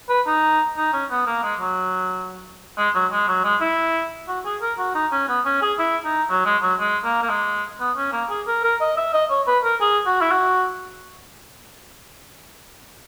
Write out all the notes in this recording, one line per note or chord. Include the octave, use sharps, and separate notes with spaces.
B4
D#4
D#4
C#4
B3
A#3
G#3
F#3
G#3
F#3
G#3
F#3
G#3
E4
F#4
G#4
A#4
F#4
D#4
C#4
B3
C#4
G#4
E4
D#4
F#3
G#3
F#3
G#3
A#3
A#3
G#3
B3
C#4
A#3
G#4
A#4
A#4
D#5
E5
D#5
C#5
B4
A#4
G#4
F#4
E4
F#4